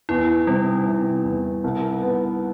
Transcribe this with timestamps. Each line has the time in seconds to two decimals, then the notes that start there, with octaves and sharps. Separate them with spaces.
0.09 E2 E4
0.47 C3 G3
0.87 C3
1.25 E2
1.64 C2
2.02 B3